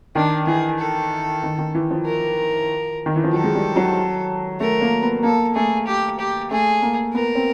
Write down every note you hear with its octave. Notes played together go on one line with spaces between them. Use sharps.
D#3 D4
E3 G#4
A4
D#3
D#3
E3
F3
A#4
D#3
E3
F3
F#3 A4
G#3
G3
F#3
A3 A#4
A#3
B3
A#3 A4
A3 G#4
G4
G4
A3 G#4
A#3
B3 A#4
C4